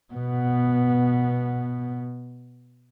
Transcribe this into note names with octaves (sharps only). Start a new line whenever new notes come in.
B2 B3